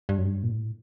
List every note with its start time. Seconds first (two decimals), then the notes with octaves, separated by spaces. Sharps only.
0.09 G2
0.18 F#2
0.26 G2
0.43 A#2
0.51 A2